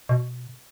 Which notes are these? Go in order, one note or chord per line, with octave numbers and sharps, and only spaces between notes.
B2